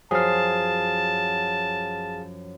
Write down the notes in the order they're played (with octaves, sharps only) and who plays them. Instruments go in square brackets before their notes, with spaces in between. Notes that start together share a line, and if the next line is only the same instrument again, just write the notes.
[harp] F#2 F3 [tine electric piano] G#4 F5 [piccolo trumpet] A5